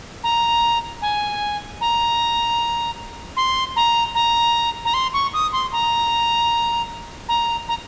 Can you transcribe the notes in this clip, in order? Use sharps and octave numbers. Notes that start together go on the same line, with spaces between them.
A#5
G#5
A#5
C6
A#5
A#5
A#5
C6
C#6
D#6
C6
A#5
A#5
A#5